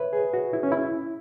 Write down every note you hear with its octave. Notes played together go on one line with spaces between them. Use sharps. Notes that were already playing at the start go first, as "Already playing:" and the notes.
Already playing: B4 C#5 E5
G#4
F#4
E4
C#4
E4